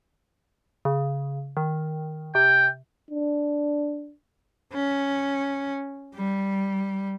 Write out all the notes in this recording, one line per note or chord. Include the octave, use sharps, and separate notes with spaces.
C#3
D#3
C3 G5
D4
C#4
G3